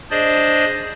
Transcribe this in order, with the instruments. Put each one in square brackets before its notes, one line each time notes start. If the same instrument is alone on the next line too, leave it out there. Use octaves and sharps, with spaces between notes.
[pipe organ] D4 G#4 C5 D5 D#5